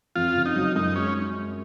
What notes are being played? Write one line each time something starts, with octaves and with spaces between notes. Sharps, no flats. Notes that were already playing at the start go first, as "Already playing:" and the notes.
F2 F4
C#3
D#4
F#3
F#2 D#4
G#3 C#4